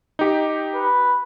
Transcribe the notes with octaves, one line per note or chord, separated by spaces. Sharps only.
D#4 G4
B4